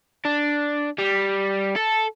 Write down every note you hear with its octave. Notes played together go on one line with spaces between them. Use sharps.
D4
G3
A4